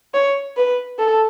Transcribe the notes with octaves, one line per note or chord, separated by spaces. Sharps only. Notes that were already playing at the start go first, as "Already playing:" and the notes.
C#5
B4
A4